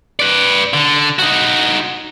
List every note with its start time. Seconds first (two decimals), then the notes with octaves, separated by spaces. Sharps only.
0.20 B4 D5
0.74 D3
1.19 D#4 F#4